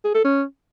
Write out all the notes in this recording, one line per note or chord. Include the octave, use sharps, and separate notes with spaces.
G#4
A4
C#4